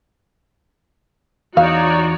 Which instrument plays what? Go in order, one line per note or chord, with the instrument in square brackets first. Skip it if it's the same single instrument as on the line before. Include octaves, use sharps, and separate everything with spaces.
[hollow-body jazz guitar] E2 [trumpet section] D#4 [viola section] F#4 C#5 D5 [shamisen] F5